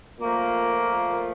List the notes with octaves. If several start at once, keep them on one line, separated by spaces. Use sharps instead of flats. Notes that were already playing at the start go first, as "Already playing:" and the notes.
A#2 F3 A3 A#3